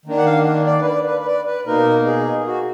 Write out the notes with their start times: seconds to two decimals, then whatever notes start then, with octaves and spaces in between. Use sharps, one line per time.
0.06 D#3 A#3 D4
0.18 F#5
0.26 F5
0.66 D5
0.81 B4
0.86 D5
1.06 B4
1.21 B4
1.27 D5
1.47 B4
1.66 B2 A#3 D#4 A#4
2.06 G#4
2.46 F#4